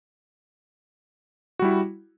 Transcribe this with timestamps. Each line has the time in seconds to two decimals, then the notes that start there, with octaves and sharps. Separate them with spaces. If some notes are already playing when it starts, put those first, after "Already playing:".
1.59 F#4
1.62 G3
1.65 E4